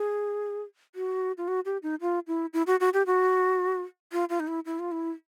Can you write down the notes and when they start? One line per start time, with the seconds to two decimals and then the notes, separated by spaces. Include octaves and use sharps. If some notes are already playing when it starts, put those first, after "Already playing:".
Already playing: G#4
0.95 F#4
1.38 F4
1.48 F#4
1.65 G4
1.83 D#4
2.01 F4
2.28 E4
2.53 E4
2.67 F#4
2.80 F#4
2.94 G4
3.06 F#4
4.12 F4
4.29 F4
4.40 D#4
4.48 E4
4.66 E4
4.79 F4
4.92 E4